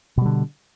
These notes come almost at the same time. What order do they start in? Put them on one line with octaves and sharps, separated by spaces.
B2 G3 D3